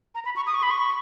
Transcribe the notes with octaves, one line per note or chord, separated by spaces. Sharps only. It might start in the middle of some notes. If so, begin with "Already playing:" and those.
A#5
B5
C#6
D#6
C#6
B5
C#6